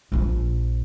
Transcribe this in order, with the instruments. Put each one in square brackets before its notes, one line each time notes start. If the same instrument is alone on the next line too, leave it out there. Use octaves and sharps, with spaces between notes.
[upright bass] A#1 F3